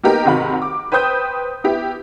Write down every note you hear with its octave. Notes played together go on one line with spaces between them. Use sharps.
A#3 B3 D#4 G4 A#4 D#5
G#2 C3 D#3 F#4 B5
D6
B4 C5 G5 D#6 G6
B3 E4 G4